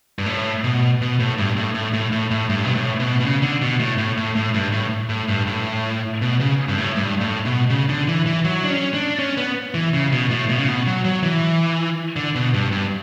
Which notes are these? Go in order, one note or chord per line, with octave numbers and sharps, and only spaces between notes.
G2
A2
B2
B2
A2
G2
A2
A2
A2
A2
A2
G2
B2
A2
B2
B2
C#3
D3
B2
A2
A2
A2
A2
G2
A2
A2
G2
A2
B2
C#3
G2
A2
G2
A2
B2
C#3
D3
E3
E3
F#3
D4
C#4
D4
C#4
B3
E3
C#3
B2
A2
B2
C#3
B2
F#3
F#3
E3
D3
B2
G2
G2